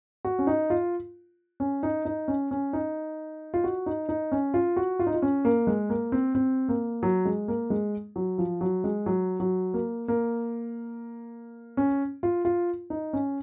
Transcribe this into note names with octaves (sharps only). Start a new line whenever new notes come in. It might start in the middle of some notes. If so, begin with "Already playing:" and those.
F#4
C#4
D#4
F4
C#4
D#4
D#4
C#4
C#4
D#4
F4
F#4
D#4
D#4
C#4
F4
F#4
F4
D#4
F4
C#4
A#3
G#3
A#3
C4
C4
A#3
F#3
G#3
A#3
G#3
F#3
F3
F#3
G#3
F#3
F#3
A#3
A#3
C#4
F4
F4
D#4
C#4